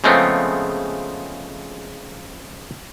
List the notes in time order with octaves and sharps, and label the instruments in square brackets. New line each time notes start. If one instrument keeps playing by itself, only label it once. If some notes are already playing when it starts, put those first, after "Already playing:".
[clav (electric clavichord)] C#3 F3 G#3 A3 B3 C4